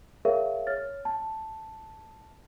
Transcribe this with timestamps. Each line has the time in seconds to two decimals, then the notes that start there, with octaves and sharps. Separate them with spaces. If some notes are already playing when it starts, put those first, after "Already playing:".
0.25 G#4 A#4 C#5 E5 F5
0.67 C#5 F6 A6
1.05 A5